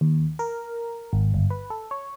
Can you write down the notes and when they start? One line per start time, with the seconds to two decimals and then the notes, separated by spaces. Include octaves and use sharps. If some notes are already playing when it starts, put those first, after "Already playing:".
0.01 D#2
0.39 A#4
1.13 G#1
1.34 G1
1.50 B4
1.70 A4
1.91 C#5